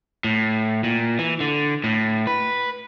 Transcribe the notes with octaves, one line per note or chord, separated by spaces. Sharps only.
A2
A#2
E3
D3
A2
B4